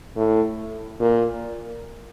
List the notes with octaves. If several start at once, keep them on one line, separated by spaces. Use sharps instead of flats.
A2
A#2